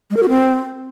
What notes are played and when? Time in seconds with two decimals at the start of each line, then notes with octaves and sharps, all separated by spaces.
0.11 G#3
0.17 A#4
0.23 F#4
0.29 C4